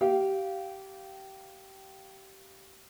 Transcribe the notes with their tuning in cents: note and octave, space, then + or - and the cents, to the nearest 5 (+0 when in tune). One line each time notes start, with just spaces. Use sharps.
G4 -20 F5 -5